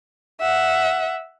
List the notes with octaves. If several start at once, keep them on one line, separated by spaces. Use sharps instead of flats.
E5 F#5